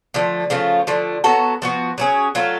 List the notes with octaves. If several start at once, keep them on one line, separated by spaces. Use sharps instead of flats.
D3 F3 A3
C#3 F3 A3 F4
D3 F3 A3
F#3 B3 F#4 A4
F3 B3 F#4
F#3 C#4 G#4
F#3 A3 F4